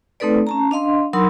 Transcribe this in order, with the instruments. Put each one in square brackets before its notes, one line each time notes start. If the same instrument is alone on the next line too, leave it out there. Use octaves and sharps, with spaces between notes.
[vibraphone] A3 C4 D#4 A4 B4 D5
C#4 A5 A#5
D4 D#5 F5 C6
F#3 D#4 A#4 B5 C6 E6